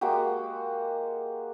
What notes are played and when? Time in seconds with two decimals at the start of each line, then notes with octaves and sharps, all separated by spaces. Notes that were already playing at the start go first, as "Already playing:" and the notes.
0.01 G#3 A#3 F#4 G4